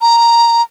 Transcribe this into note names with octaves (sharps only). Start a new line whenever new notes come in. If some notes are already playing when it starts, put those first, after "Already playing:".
A#5